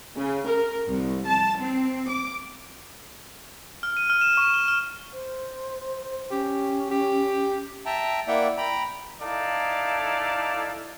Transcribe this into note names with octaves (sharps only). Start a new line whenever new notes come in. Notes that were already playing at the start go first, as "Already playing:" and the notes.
C#3
A#4
C2
A5
C4
D6
F6
D#7
F6
E7
C#6
G7
F6
C5
C#4 G4
G4
E5 G5 A5 A#5
A#3 E4 D5 E5 F#5 G5
G5 A#5 B5
D#4 E4 A4 D5 F5 A5